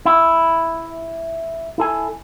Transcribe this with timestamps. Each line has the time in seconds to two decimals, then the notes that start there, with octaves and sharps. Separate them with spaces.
0.05 E4
1.78 E4 A4 G#5